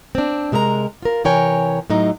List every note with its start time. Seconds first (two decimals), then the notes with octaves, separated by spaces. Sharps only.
0.15 C4 D4
0.52 C3 G#3 A#4 D#5 A#5
1.03 F4 A#4
1.24 C3 E3 A#4 C#5 G5 G#5
1.90 A2 F#3 D#4 D#5 A#5